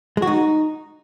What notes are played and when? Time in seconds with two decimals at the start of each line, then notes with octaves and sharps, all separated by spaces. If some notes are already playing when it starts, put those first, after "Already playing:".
0.17 G#3
0.22 F#4
0.27 D#4